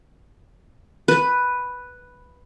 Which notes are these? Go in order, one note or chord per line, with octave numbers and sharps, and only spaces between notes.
B4